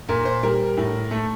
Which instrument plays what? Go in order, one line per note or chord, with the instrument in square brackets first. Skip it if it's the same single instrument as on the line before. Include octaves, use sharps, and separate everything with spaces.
[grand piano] A#2 A#4
C5
G3 A#4
A2
A3 A4